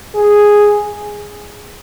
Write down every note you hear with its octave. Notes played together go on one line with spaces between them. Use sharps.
G#4